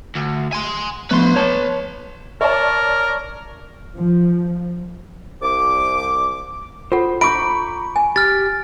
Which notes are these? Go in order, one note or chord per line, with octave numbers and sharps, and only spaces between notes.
D2
G#5 C6
F3 A3 B3 B4 C6
C#5 A5
A#4 C#5 D5 A5
F3
C2 D6
F4 A4 C5 F#5
E5 A#5 B5 C#6 D6 G6 D7
G#5
G4 F6 A6